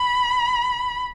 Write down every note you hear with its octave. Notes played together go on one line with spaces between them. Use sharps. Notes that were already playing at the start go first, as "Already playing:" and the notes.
Already playing: B5